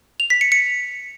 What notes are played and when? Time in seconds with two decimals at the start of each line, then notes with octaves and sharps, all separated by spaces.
0.20 F7
0.30 B6
0.41 C#7
0.52 C#7